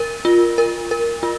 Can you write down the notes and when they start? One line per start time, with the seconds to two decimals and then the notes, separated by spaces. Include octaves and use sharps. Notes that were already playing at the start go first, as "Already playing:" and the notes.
Already playing: A#4
0.25 F4
0.58 A#4
0.91 A#4
1.23 F4